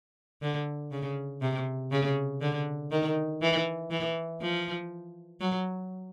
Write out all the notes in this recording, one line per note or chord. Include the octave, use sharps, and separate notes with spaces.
D3
C#3
C3
C#3
D3
D#3
E3
E3
F3
F#3